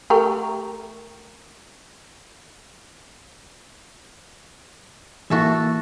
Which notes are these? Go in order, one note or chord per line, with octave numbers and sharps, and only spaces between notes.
A3 G4 A#4
E3 A#3 F#4 A4 E5